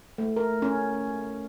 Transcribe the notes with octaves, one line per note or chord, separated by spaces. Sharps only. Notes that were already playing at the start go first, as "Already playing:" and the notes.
A3
A#4
C#4